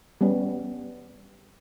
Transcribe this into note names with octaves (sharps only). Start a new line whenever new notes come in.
G3 B3 C#4